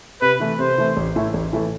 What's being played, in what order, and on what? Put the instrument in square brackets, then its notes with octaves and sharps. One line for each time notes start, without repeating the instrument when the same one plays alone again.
[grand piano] C3 [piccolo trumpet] B4
[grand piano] E3 A3
[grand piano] C3 [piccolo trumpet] C5
[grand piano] E3 A3
A1
A2 E3 A3 E4
A1
A2 E3 A3 E4